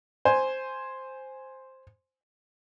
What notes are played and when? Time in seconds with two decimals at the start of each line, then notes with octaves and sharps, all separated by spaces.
0.25 C5 G#5